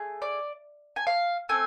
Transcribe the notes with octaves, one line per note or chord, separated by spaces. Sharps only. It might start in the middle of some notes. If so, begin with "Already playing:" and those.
Already playing: A3 G#4
D5
G#5
F5
A3 C4 G#5